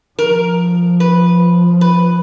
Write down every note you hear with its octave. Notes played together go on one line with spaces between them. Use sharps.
F3 A#4
B4
B4